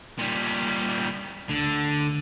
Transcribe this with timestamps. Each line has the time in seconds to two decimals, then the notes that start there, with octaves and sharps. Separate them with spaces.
0.18 A#2 G3
1.49 D2 D3